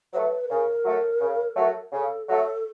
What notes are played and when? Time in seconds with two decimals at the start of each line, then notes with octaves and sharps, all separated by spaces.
0.13 F#3 A3 B4 C5
0.49 C#3 A#4
0.85 F#3 A3
1.21 C#3
1.56 F#3 A3
1.92 C#3 A4
2.28 F#3 A3 A4